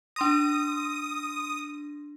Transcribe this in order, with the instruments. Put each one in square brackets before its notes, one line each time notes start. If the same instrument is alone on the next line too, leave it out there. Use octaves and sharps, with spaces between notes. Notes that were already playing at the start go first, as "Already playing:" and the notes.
[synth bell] D4 C6 A#6 [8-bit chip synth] D#6